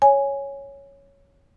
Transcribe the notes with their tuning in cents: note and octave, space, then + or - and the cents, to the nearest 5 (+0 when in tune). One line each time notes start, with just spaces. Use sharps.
C#5 +0 G#5 +0